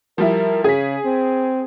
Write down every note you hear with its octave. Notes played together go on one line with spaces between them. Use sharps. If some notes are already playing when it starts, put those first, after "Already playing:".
F3 G3 E4 A#4
C#3 G#4 B6
C4